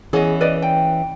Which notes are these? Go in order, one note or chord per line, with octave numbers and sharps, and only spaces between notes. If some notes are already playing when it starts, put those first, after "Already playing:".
E3 B3 C#4 G#4 D#5
B4 D5 D#5
G5